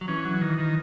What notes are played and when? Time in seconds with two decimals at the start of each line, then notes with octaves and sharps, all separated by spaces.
0.01 F#3
0.08 E3 C#4
0.25 F#3
0.41 D#3
0.58 D#3